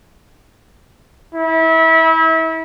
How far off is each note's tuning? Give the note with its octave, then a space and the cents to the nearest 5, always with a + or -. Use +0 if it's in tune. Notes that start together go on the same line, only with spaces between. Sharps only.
E4 -30